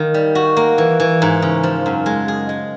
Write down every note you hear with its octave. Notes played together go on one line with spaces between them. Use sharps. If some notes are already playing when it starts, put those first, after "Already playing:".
Already playing: D#3 A#3
G3
F#4
A#3
E3
E3
G#2
C#3
F3
F#2
G#3
G#4
G#3